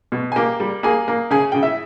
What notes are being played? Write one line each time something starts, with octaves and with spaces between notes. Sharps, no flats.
B2
G#5
A#3 G4 G5
G3
A#3 G#4 G#5
A#3
C#3 G#4 G#5
C#3 G5
E4 E5